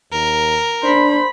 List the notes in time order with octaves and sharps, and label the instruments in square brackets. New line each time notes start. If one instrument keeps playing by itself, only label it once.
[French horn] D#2 [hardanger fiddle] A#4
[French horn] D4 [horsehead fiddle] C5 B5